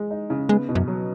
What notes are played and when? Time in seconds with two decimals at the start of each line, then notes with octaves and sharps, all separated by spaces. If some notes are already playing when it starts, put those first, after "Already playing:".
Already playing: G#3
0.10 D#4
0.30 C#3
0.49 G#3 B3
0.69 B2
0.75 F#2
0.88 F#3